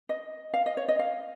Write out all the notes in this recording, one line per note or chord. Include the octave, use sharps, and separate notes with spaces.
D#5
F5
D#5
C#5
D#5
F5